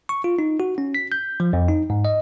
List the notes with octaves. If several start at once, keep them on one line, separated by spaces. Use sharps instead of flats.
C#6
F4
D#4
F#4
C#4
B6
G6
F3
F2
D#4
G#2
D#5